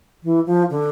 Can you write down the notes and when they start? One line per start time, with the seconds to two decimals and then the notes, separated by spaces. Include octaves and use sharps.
0.23 E3
0.46 F3
0.70 D3